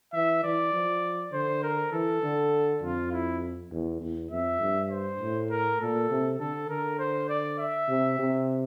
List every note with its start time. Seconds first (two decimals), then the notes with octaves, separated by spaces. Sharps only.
0.13 E3 E5
0.44 E3 D5
0.73 F3
1.32 D3 C5
1.63 A#4
1.92 E3 A4
2.23 D3
2.82 F2 F4
3.12 E4
3.71 E2
4.01 E2
4.31 F2 E5
4.61 G2
4.91 C5
5.20 A2
5.50 A#4
5.80 A#2 A4
6.10 C3
6.39 D3 A4
6.69 D3 A#4
6.99 C5
7.29 D5
7.59 E5
7.88 C3
8.19 C3